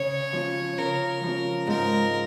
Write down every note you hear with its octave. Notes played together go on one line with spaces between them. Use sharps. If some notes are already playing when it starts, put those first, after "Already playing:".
Already playing: C#3 C#5
F3 C#4
C#3 A#4
F3 C#4
G#2 A#4